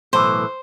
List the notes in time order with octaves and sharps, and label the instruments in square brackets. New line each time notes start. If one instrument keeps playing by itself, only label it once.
[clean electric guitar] B1 A2 E3 [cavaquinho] C5